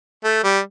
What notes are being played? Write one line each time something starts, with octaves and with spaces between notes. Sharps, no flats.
A3
G3